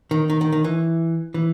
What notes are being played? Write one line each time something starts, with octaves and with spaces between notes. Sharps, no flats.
D#3
D#3
D#3
D#3
E3
E3